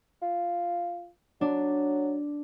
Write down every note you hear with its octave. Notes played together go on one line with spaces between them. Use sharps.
F4
F#3 D4